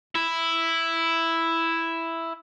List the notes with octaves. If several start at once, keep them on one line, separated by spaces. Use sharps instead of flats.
E4